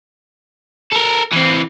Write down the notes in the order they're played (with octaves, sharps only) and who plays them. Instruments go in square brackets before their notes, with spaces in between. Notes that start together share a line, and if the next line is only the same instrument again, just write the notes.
[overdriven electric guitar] A4 A#4
E3 C4